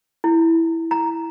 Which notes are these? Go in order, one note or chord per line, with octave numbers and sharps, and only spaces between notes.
E4
A#5